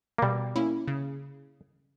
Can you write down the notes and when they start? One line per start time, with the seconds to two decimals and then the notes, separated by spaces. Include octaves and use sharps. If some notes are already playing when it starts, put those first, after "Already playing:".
0.18 A#3
0.22 B2 G3
0.56 A#3 C#4 E4
0.87 C#3